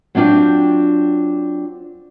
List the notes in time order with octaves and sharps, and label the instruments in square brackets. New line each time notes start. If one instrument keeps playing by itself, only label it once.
[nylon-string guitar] F#3 C4 D4 F4 G5